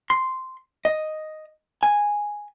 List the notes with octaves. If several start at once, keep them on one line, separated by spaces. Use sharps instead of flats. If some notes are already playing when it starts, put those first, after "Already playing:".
C6
D#5
G#5